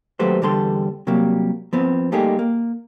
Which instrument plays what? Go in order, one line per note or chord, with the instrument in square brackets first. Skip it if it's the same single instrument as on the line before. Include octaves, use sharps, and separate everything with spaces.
[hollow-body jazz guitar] D#2 F#3 A3 G4 B4 C5
E2 D3 G3 A4 C6
C3 F#3 G3 A#3
F3 B3 C4
G3 A3 A#3 D#4 G4 G#4
A#3